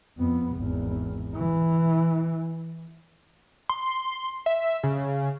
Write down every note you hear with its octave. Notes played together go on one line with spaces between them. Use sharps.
F2 B3
G#1 E2
E3
C6
E5
C#3